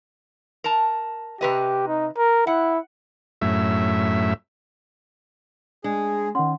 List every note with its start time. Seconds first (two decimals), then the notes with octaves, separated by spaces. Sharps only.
0.64 A#4 A5
1.41 C3 G4 B4 D#5
1.88 D#4
2.17 A#4
2.47 E4 F#5
3.42 F#2 A2 E5
5.84 G#3 D4 G#4
6.35 D#3 C#4 F#5 C6